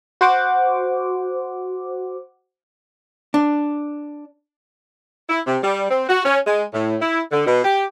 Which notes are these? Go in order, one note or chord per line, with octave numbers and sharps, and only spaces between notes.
F#4 C5 F#5 D6
D4
E4
C3
G3
C4
F#4
C#4
G#3
A2
E4
D3
B2
G4